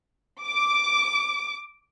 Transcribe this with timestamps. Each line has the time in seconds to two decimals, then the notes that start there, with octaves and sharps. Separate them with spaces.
0.45 D6